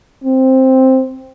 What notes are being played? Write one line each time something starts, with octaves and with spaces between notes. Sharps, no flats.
C4